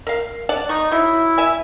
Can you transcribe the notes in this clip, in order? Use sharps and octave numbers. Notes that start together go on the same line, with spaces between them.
A#4 F5
D5 F#5 A5
D#4 C#6
F#3 E4
E5 G#5